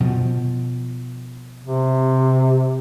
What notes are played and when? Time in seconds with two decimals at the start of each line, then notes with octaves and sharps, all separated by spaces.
0.01 B2 F3
1.64 C3